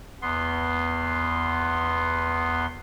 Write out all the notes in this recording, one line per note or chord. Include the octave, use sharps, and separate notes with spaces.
E2 B3 C6